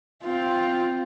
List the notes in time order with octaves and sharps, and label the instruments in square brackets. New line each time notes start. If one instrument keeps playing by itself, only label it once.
[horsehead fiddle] C4 F4